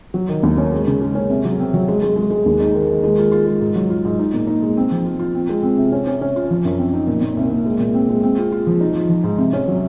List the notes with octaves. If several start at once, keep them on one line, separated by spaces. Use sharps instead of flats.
F#3
D#3
D#2
C#4
G#3
C#3
G#3
C#4
C3
F#3
C4
F#3
G#3
G#3
G#3
G#3
D#2
D#4
D#3
D#3
G#3
F4
F4
G#3
G#2
F#3
F4
G#2
D#4
A#2
D#4
G#3
C4
F3
F4
F4
C4
G#3
C4
C3
C#4
C#4
C#4
F4
F3
F#2
C4
D#4
A#2
A#2
C2
A#2
G#3
A#2
C4
G#3
C4
F4
F4
F3
D#4
F3
F3
G#2
C3
C#4
F#3